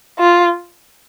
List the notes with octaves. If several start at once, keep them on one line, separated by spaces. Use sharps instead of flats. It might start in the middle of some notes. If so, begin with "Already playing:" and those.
F4